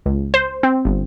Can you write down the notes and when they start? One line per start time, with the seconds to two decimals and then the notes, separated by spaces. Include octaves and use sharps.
0.06 C#2
0.34 C5
0.63 C4
0.85 G1